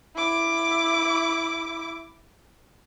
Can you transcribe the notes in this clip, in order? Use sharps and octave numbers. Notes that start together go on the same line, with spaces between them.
E4 D6